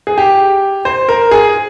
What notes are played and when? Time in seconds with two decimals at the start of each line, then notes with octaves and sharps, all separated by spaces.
0.07 G#4
0.18 G4
0.85 C5
1.09 A#4
1.31 G#4